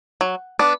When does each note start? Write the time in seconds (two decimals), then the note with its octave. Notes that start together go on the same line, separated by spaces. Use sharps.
0.21 F#3
0.59 B3 D4